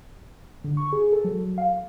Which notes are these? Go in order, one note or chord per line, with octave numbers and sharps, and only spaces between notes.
D3
C#6
G#4
A4
F#3
F5